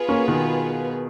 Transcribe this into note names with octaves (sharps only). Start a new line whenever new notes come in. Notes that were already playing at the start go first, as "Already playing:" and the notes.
Already playing: B3 F4 G#4 B4
A#3 C#4
B2 D#3